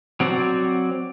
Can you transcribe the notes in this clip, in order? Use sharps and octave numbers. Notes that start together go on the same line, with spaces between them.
F#3 C4 F#4 D5